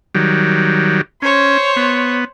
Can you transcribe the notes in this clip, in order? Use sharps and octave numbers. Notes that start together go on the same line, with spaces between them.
D#3 F#3 G3
C#4 C5 C#5
B3